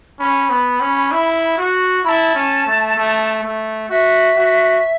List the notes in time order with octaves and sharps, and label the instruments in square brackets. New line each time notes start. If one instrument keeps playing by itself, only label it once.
[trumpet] C#4 [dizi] B5
[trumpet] B3
C#4
E4
F#4
[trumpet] E4 [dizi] A5 B5
[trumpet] C#4
A3
A3
A3
[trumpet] F#4 [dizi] E5
[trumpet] F#4